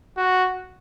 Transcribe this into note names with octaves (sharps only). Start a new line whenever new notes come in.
F#4